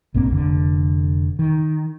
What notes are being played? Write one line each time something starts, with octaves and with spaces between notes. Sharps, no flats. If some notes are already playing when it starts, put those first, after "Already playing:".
A#1 G2 A#3 C4
F1 D3
D#3